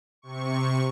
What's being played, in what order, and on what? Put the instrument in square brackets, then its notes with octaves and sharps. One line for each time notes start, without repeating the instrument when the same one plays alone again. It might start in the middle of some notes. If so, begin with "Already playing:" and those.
[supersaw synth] C3 C#6